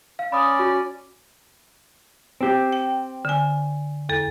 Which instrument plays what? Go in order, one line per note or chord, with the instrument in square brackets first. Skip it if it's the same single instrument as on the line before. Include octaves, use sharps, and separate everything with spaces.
[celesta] F5
[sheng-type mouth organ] C#4 D5 [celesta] B5 D#6
[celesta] F#4
[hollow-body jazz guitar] C4 G4
[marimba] G5
D3 G#5
E2 A4